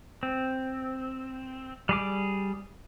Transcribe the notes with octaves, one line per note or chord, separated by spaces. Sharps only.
C4
G3 G#4 D6